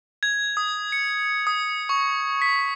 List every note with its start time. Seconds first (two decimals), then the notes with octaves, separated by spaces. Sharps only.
0.23 G#6
0.57 D#6
0.92 C#7
1.47 D#6
1.89 C#6
2.42 B6